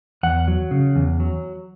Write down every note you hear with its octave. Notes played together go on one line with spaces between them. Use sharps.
E2 F#5
F#3
C#3
E2
F#3